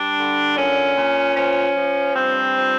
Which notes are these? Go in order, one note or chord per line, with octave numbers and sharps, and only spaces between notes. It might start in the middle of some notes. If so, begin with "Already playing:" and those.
Already playing: G2 D4
D3
A#2 C#4
A#2
F3 C#4
F3
G2 C4
F3